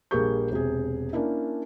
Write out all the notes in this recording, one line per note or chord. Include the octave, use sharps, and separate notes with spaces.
A#1 G3 A#3 G#4 C#6 G6
E1 C3 G#4
A#3 C#4 D4 E4